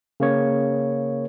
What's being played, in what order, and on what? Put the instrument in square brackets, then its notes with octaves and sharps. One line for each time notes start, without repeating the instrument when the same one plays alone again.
[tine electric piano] C#3 A#3 C#5